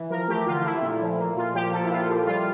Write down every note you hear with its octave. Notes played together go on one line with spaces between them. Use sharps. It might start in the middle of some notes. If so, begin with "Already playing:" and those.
Already playing: E3
F3 A#4
A3 G4
D3 F4
A3 E4
A#2
F3
A#3
A#2 F4
F3 G4
A#3 A4
E4
A#2 F4
F3 G4
G3 F4